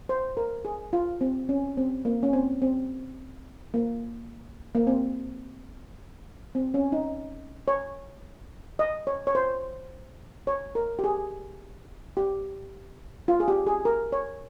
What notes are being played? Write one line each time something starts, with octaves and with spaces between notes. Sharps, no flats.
C5
A#4
G#4
F4
C4
C#4
C4
A#3
C#4
C4
C4
A#3
A#3
C4
C4
C#4
D#4
C#5
D#5
C#5
C#5
C5
C#5
A#4
G4
G#4
G4
F4
G#4
G4
G#4
A#4
C#5